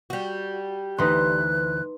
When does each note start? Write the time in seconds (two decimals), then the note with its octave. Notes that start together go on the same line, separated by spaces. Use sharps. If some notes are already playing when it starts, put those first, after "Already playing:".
0.10 G3 F#4
0.98 D2 E3 D#4 B4 C6 F#6